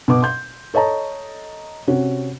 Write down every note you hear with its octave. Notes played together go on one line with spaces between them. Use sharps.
B2 B4 D6
C6 G6
A4 C#5 D#5 A5 A#5
C3 C#4 F#4